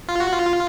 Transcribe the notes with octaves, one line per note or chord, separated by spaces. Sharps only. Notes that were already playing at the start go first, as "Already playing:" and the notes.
F4
F#4
F4